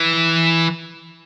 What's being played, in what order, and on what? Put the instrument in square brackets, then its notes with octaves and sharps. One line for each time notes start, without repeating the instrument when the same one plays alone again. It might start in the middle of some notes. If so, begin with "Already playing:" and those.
Already playing: [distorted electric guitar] E3